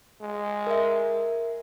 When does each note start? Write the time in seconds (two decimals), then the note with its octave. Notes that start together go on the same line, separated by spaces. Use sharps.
0.21 G#3
0.67 A#4 E5